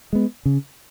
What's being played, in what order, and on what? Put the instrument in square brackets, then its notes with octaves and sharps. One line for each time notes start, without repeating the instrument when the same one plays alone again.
[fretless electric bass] G#3 B3
C#3